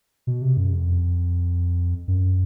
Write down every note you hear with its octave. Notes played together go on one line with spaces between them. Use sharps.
B2
C3
F#2
F2
F#2